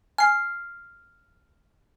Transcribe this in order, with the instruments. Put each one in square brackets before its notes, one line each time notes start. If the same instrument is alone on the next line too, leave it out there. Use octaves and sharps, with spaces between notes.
[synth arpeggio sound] G#5 [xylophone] F6 C7